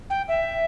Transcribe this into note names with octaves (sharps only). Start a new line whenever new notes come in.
G5
E5